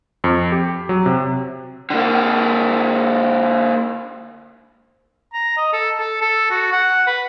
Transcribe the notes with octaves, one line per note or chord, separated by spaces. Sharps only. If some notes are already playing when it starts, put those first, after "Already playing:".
F2
G4
F#3
C3
D3 A#3
A#5
D#5
A4
A4
A4
F#4
F#5
B4